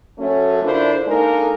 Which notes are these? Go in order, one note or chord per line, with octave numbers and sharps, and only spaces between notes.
F#2 A3 C#4
D3 D4 E4 F4 A#4 C5
G#3 A#3 D4 D#4 A4 A#4